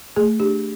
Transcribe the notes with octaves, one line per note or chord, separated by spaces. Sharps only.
A3 G#4
D4 G4